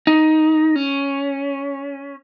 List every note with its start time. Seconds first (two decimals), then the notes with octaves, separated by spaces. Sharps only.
0.07 D#4
0.76 C#4